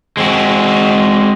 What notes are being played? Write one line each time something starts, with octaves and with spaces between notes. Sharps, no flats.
G#3 C4 F#4